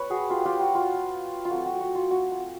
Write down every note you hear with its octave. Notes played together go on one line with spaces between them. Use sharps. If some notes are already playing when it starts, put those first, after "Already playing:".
Already playing: B4 C#5
F#4 G#4
F4 G4
F4 G4
F#4
F4
F4
F#3 A3 C4 F#4
F#4
F#4
F4
F#4
F4